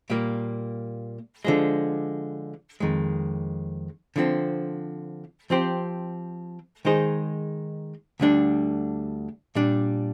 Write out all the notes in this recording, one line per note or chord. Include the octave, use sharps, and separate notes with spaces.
A#2 G3 A#3
D3 F3 G#3
F2 D#3 G#3
D3 F3 C4
F3 C4 G4 C5
D#3 G#3 D#4 G#4 C5
D2 D3 G3 D4
A#2 G3 D4